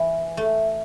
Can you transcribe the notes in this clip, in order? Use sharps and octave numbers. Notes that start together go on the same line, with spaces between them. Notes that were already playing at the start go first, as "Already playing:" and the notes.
Already playing: E3
A3